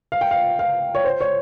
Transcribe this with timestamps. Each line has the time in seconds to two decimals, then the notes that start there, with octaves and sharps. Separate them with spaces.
0.12 F5
0.21 G5
0.31 F5
0.59 F5
0.95 C#5
1.04 C5
1.21 C#5